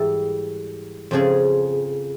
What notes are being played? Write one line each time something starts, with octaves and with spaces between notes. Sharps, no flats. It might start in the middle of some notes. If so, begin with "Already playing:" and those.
Already playing: G#2 E3 G3 A4
F2 C#3 F3 G#4